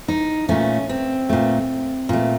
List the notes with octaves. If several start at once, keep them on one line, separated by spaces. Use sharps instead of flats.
D#4
A#2 A3 C#4
C4
A#2 A3
A#2 A3